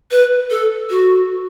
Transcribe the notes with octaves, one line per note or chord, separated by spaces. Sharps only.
B4
A4
F#4